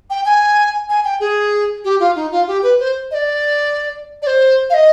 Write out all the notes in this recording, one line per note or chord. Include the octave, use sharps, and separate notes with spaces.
G5
G#5
G#5
G5
G#4
G4
F4
D#4
F4
G4
B4
C5
D#5
D5
D5
C5
F5
D#5